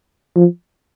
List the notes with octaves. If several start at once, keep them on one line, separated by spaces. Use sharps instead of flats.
F3